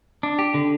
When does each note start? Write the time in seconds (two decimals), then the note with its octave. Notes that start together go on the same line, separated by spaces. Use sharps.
0.23 D4
0.39 G4
0.54 D3